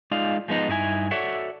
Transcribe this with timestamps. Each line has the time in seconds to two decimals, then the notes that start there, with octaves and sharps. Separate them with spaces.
0.11 G#3 D#4 F4 D5 F5
0.48 F3 G#3 B3 D#4
0.68 G2 D#4 E4 G#5
1.11 F#4 A4 C#5 D5 E5 F#5